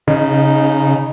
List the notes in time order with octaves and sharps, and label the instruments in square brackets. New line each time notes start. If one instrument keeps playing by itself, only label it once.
[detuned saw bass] C#3 [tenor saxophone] D#4